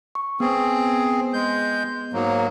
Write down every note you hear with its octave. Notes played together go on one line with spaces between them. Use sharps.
C#6
B3 C4 G#4
G#3 G6
G#2 F#3 A#3